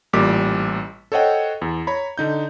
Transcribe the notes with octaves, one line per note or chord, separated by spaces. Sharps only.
A1 A#2 G3 D6 B6
A4 C5 C#5 D#5 F#5 G5
E2
C#5 A#5 B5
D3 D#4 G6